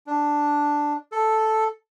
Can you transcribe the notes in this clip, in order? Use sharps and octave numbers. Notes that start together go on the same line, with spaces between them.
D4
A4